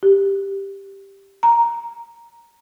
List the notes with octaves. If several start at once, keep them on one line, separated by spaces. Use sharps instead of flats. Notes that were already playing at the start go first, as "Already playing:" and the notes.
G4
A#5